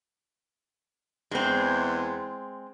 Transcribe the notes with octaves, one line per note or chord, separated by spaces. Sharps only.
E2 G#3 C4